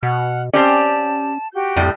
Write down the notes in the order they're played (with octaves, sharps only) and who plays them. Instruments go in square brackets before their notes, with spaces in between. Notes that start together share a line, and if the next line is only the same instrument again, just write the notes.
[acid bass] B2 [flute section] F#5 F6
[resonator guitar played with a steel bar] C4 G4 D5 [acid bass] C#4 [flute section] A5
[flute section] F#4 G4 G6
[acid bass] F2 [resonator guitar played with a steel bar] A2 G3